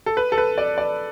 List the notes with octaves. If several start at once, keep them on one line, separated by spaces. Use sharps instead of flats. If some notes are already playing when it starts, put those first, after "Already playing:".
A4
B4
A4
B4
D5
D5